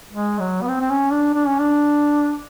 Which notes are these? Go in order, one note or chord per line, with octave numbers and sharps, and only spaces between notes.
G#3
F#3
B3
C4
C4
C#4
D4
D4
C#4
D4